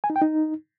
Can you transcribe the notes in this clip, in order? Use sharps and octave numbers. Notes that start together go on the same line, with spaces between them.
G#5
D#4
G5
D#4